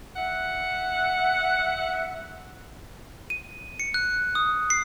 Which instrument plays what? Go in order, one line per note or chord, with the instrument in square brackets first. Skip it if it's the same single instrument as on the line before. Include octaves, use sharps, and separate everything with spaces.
[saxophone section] E5 F#5
[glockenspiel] D#7
C#7
F#6
D#6
C7